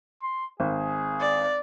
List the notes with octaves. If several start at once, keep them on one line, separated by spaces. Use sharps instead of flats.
C6
G#1 G#4
D5